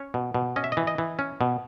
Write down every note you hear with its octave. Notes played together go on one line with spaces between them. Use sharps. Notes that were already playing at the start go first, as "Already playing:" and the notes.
Already playing: C#4 C#5
B2
B2
C#4 D#5
E5
D#5
E3
D#5
E3
C#4
B2